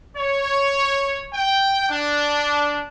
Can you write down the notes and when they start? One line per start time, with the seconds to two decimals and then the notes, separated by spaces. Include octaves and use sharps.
0.17 C#5
1.32 G5
1.90 D4